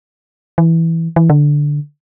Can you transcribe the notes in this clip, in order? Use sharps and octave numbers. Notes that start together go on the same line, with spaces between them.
E3
E3
D3